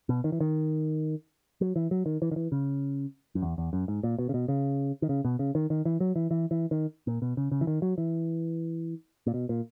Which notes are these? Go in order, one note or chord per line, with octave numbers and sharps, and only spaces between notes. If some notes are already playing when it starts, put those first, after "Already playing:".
B2
D#3
E3
D#3
F#3
E3
F#3
D#3
E3
D#3
E3
C#3
F#2
E2
E2
F#2
G#2
A#2
B2
C#3
B2
C#3
D#3
C#3
B2
C#3
D#3
D#3
E3
F#3
E3
E3
E3
D#3
A#2
B2
C#3
C#3
E3
D#3
F#3
E3
A#2
B2
A#2